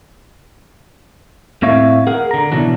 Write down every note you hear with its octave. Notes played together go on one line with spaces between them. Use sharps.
A2 C4 C#5 E5 F5
G#4 A#4 F#5
D3 A#5
B2 E3 F#3 D4